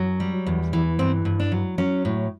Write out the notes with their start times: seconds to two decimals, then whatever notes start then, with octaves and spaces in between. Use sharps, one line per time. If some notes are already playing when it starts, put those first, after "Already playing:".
Already playing: F#2 F#3
0.20 G3
0.46 E2
0.73 E3
0.99 G2 C4
1.25 G2
1.40 D4
1.52 F#3
1.78 F#3 C#4
2.05 A2